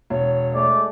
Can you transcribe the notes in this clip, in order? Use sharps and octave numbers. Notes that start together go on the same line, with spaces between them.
E1 C#5
G#3 A3 D5